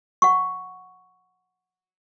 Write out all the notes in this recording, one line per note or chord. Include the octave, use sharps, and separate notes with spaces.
F#5 C#6